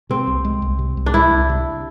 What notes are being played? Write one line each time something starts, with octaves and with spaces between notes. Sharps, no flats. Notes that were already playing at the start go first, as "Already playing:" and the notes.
C3 C4
C2
G#3
C2
C3
C2
D4
G#3 E4
C2
C3